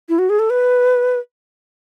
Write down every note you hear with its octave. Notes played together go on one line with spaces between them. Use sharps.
E4
F#4
G#4
A4
B4